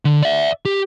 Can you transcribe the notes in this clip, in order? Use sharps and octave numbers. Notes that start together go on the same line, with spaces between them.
D3
D5 E5
G4